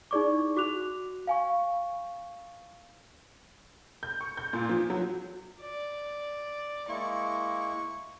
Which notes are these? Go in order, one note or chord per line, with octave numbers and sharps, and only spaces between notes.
D#4 E4 G#4 D5 C#6 D6
F#4 D6 F#6 F7
F5 G#5 C#6
G6
C#6
G6
A#2
F3
F#3
D5
G#3 A#3 E4 C#6